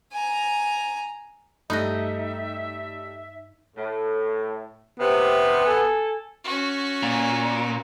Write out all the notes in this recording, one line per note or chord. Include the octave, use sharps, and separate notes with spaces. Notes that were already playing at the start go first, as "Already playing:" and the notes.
G#5 A#5
G2 G3 A3 D#4 D#5 E5 F#6 A#6
A2
C3 B3
A4 G#5
C#4 F#4
A#2